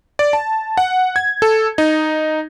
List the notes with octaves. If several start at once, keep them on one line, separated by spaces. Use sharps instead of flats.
D5
A5
F#5
G#6
A4
D#4